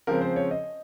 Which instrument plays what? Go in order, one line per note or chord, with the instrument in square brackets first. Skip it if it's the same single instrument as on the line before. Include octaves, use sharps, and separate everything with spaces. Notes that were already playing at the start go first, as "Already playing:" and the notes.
[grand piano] C#3 F3 G#3 C4 A#4
C5
C#5
D#5